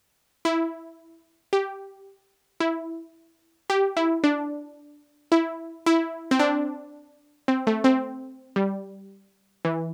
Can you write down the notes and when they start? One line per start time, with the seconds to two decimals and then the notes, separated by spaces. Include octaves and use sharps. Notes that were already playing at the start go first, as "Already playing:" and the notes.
0.45 E4
1.53 G4
2.60 E4
3.70 G4
3.97 E4
4.24 D4
5.32 E4
5.86 E4
6.31 C4
6.39 D4
7.48 C4
7.67 A3
7.84 C4
8.56 G3
9.65 E3